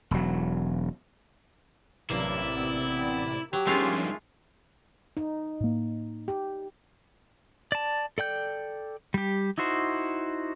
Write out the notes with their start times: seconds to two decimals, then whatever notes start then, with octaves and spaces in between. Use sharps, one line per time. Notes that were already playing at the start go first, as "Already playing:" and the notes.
0.11 E1 F#3
2.10 A1 G2 C3 F#3 A#3 E4 D5
2.56 B3 C4
3.53 F#3 G4
3.67 G2 D#3 F3 G#3 A3 C#4 F4
5.17 D#4
5.60 A2 A#3
6.28 G4
7.72 D5 A5
8.18 A4 D5 G5 G6
9.14 G3 G4
9.58 D#4 E4 F#4 C5